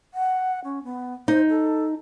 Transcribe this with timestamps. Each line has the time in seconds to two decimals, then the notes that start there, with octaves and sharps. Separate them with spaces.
0.14 F#5
0.64 C#4
0.84 B3
1.28 D#4 C5
1.49 A4